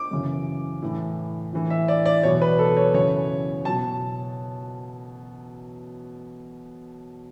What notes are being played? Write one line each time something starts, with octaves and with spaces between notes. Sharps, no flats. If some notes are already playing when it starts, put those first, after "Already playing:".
Already playing: D6
F#2 C#3 E3
A2 E3
A2 E3
E5
D5
D5
E2 B2 F#3 C#5
B4
A4
C#5
F#2 C#3 E3 C#5
B2 F#3 A5